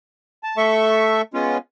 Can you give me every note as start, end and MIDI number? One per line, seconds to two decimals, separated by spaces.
0.43 0.57 81
0.57 1.22 57
0.57 1.22 69
0.57 1.22 76
0.57 1.22 85
1.34 1.58 56
1.34 1.58 59
1.34 1.58 61
1.34 1.58 65